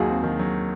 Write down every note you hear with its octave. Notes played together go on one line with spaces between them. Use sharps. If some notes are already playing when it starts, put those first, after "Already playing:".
Already playing: D#2 D#3 F#3 F4 F#4 G#4
C4
D#3
F#3